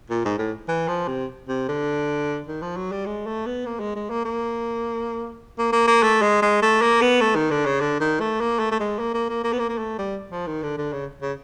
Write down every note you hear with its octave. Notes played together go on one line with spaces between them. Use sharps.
A#2
G#2
A2
E3
F3
C3
C3
D3
D#3
F3
F#3
G3
G#3
A3
B3
A#3
G#3
G#3
A#3
A#3
A#3
A#3
A#3
A3
G#3
G#3
A3
A#3
B3
A3
D#3
D3
C#3
D3
D#3
A3
A#3
A3
A3
G#3
A#3
A#3
A#3
A#3
B3
A#3
A#3
A3
G3
F3
D#3
D3
D3
C#3
C#3